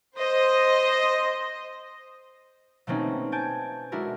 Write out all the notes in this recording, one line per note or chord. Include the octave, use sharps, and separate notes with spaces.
C5 D#5
B2 A3 A#3 C4 C#4 D#4
G#5 A5 G6 D7
G#3 D4 E4 F#4 A#4